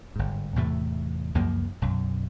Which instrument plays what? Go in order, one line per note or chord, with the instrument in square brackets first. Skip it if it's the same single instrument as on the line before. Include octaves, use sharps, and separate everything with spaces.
[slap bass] G1 G#2
E2 A2 C3 A3
C#2 F#2 F3 A#3
B1 F#2